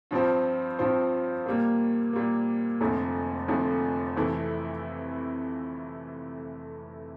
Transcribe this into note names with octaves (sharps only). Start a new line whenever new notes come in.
G2 F3 C4 F4 C5
G2 F3 C4 F4 C5
A#2 G3 A#3
A#2 G3 A#3
F1 F2 D3 F3 A3
F1 F2 D3 F3 A3
F2 C3 E3 A3 E4